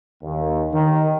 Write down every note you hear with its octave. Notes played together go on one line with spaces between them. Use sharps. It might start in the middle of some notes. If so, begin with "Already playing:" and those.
D#2
D#3